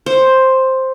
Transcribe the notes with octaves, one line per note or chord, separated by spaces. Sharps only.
C5